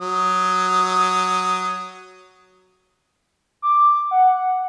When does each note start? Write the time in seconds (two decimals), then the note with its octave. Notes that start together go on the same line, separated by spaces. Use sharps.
0.01 F#3 D#6
3.62 D6
4.11 F#5